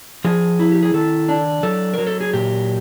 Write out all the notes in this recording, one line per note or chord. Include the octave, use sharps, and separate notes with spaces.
F3 G#4
E4
G4
G#4
D#3 A4
D4
F#3 A4
F#3 A#4
A4
G#4
A#2 G4